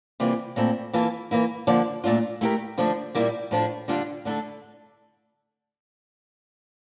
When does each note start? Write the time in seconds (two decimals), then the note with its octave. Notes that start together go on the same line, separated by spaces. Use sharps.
0.20 C3 E3 G3 A#3 F4
0.56 A#2 A3 C4 E4 A4
0.93 E3 A#3 F4 A4
1.31 E3 A#3 E4
1.67 D3 F3 A#3
2.04 A#2 A3 D4 F4
2.41 A3 E4 G4 A#4
2.78 D3 F3 A3 D4
3.15 A#2 G3 A#3 E4
3.51 A2 F3 A3 D4
3.88 D3 G3 D4 F4
4.25 D3 A3 E4 A4